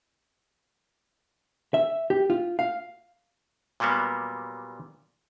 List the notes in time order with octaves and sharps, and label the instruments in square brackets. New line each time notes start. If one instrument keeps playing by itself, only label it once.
[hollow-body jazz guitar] E5
G4
F4
F5
[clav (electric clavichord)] A#2 F#3 G3 A#3 B3